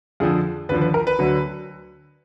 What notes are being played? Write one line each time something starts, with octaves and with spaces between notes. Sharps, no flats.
F2 D3 F3 G#4
D#2 D3 F3 B4
B4
A#4
B4
D2 D3 F#3